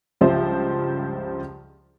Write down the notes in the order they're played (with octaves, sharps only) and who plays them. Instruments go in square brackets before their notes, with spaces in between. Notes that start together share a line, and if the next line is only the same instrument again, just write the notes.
[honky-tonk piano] C#2 G2 F3 G4 C5 E5